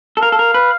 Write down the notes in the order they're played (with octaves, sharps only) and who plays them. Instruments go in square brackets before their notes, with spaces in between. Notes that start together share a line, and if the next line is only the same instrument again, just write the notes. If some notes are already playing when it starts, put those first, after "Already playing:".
[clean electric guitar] A4
[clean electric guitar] A#4 [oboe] F5
[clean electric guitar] A4
A#4
B4